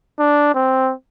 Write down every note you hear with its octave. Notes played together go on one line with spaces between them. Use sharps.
D4
C4